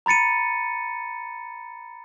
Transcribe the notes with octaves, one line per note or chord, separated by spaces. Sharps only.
A#5 B5 A6 C#7 D#7